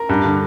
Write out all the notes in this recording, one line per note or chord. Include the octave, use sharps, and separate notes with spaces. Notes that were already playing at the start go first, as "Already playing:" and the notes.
Already playing: A#4 A#5
G2
D3